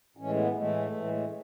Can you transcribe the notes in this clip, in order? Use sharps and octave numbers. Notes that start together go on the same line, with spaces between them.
A2 E3 G#3 C#4
B3
A2 E3 G#3 A3
A2 E3 G#3